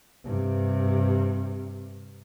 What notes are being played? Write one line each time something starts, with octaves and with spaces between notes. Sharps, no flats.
G2 C3